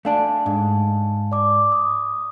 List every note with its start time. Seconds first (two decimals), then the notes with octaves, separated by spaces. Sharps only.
0.05 A3 D4 D5 F5 G#5 A5
0.46 G#2
1.32 D5 D6
1.72 D#6